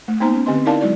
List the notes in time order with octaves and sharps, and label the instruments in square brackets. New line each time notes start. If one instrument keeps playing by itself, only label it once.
[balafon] A3
A#3 B3 D#4 C5 A#5
C#4
D3 C4 G4 B4 D#5 C6
D#4 E4 A#4 D5 F5 A5
F#3 G#3 E4 F#4 D5